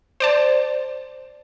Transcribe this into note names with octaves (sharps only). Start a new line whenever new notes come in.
C5 D5 A5